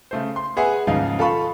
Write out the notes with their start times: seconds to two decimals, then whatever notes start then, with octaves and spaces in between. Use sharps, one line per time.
0.11 C#3 A3 C5
0.36 C6
0.57 B3 G#4 B4 E5 F#5 G#5
0.87 D#2 G#2 C#3 F3 D#4 F5
1.19 F4 A4 F5 B5 C#6